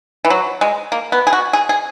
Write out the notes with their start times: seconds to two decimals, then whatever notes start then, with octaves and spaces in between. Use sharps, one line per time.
0.25 E3
0.30 F#3
0.61 G#3
0.92 A#3
1.12 B3
1.27 G#4
1.33 F#4
1.53 G#4
1.69 G#4